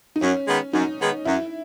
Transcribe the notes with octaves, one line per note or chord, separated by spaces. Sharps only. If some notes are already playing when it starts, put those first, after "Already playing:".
D#4
F#2 C#4
D#3 G#3 B3
F#2 D#4
D#3 G#3 B3
F#2 E4